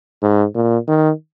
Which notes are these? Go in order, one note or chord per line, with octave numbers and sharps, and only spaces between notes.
G#2
A#2
D#3